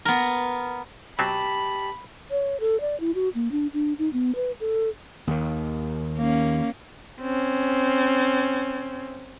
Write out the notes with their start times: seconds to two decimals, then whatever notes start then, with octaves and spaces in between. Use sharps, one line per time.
0.05 B3 A#4
1.19 B2 F#3 C4 G4 A5 B5 B6
2.31 C#5
2.60 A4
2.81 D5
3.00 E4
3.15 F#4
3.35 A#3
3.52 D4
3.73 D4
3.99 D#4
4.13 B3
4.35 B4
4.60 A4
5.27 D#2 D#3
6.17 A#3 C#4
7.21 C4 C#4